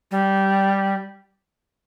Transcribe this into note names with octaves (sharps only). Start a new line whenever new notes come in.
G3